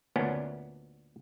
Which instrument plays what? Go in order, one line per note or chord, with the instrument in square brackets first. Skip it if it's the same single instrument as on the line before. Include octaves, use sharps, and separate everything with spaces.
[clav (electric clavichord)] D2 A#2 B3 C#4 D4